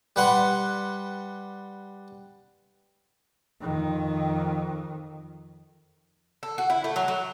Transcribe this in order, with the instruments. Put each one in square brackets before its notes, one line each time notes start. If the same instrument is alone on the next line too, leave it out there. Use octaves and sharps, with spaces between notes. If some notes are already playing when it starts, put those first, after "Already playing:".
[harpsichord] G3 B4 F#5 C6
[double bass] F2 D#3
[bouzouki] A4
F#4
E4
A3
F#3
F#3